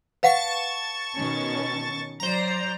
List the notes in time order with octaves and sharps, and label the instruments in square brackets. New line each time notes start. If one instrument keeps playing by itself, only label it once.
[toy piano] B4 F5 F#5 [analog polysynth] A5 C#6 A6
[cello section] B2 D#3 C#4
[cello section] F#3 D5 [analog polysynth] C5 A#5